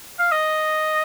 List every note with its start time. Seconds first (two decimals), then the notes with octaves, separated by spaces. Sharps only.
0.19 F5
0.31 D#5